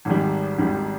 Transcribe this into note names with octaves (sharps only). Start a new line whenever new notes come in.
G#1 G#2 D#3 G3
G#1 G#2 D#3 G3